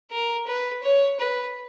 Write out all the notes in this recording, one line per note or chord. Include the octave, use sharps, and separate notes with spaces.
A#4
B4
C#5
B4